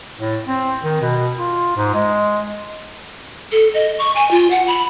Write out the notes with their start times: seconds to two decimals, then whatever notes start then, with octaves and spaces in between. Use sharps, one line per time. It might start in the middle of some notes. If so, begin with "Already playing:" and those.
0.19 A2
0.47 C4
0.83 D#3
1.02 B2
1.39 F4
1.77 G#2
1.94 G#3
3.52 A4
3.74 D#5
3.99 C#6
4.15 G#5
4.31 F4
4.51 F#5
4.67 B5